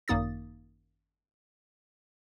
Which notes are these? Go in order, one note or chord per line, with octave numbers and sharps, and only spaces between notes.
G#1 F#2 A#3 D#4 D#6 A6